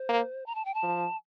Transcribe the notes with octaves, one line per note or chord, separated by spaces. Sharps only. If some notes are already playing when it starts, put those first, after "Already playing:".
Already playing: C5
A#3
A#5
A5
G5
A5
F3